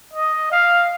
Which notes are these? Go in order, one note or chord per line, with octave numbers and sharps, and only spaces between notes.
D#5
F5